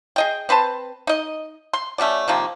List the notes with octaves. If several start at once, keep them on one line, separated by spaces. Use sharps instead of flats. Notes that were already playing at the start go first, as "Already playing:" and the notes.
G#4 D#5 G5
C4 B4 C5 A5
D#4 D#5
C6
A3 C#4 F#4 D5
C3 D#3 F3 A#3